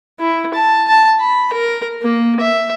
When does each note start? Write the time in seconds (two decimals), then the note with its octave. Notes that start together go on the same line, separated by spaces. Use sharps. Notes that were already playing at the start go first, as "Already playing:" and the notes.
0.20 E4
0.54 A5
0.88 A5
1.20 B5
1.53 A#4
2.03 A#3
2.40 E5